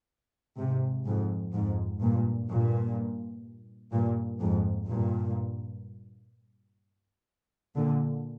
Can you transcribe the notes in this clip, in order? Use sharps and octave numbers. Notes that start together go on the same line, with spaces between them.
G#2 C3
F2 G#2
F2 G#2
G2 A#2
G2 A#2
G2 A#2
F2 G#2
G2 A#2
A#2 D3